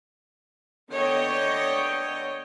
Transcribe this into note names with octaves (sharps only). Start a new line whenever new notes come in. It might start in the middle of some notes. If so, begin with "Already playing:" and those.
D3 B3 C#5 D#5 G5